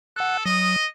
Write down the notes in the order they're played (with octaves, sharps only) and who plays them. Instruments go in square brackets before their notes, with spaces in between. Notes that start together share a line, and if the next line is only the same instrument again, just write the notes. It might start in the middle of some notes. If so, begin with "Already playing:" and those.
[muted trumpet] A4 [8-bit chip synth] F#5 F#6
[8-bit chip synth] F#3 D#6 [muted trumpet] D#5